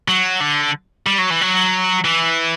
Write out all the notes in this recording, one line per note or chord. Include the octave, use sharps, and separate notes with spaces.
F#3
D3
G3
F#3
E3
F#3
E3